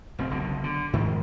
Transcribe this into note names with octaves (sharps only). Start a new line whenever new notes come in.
F1 A#2 C4
F#1 B1 B2 D3
D3
G#2 D#3 F3 G#3